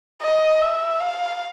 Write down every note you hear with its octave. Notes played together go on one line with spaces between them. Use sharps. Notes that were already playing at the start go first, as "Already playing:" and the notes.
D#5
E5
F5